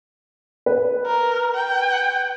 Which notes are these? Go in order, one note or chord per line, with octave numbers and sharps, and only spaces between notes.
B4
A#4
G5